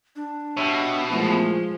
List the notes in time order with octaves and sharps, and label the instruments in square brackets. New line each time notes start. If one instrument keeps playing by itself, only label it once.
[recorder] D4
[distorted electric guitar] B2 [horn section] G4 C#5 E5
[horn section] A#2 E3 [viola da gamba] F3 G#3 [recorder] A3